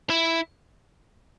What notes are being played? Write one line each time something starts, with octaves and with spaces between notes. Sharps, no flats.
E4